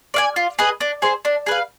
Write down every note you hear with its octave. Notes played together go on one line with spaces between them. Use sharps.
D5 F5 G#5
F4
G#4 B4 D#5
D4
G#4 C5
D4
G#4 B4 F5